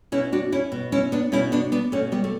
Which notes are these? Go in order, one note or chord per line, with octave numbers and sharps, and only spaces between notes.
B2 C#4 E4
D4 F#4
C#4 E4
B2
C#4 E4
B3 D4
B2 C#4 E4
B3 D4
B3 D4
B2 A3 C#4
G3 B3
A3